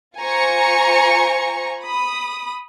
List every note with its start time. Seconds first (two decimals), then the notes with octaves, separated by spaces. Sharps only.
0.18 F4 C5 G#5 A#5 C#6 C#7
1.80 B5 D#6